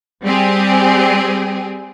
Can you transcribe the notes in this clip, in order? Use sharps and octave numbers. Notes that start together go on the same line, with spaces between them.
G3 C4 G4 G#4